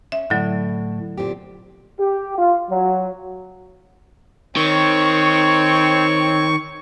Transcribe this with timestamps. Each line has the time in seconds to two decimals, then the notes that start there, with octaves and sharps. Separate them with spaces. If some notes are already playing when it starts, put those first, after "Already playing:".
0.12 C#4 E5
0.30 A2 D3 F#3
1.18 A#2 C4 G4
2.00 G4
2.38 F4
2.70 F#3
4.56 D#3 C4 C#5 C#6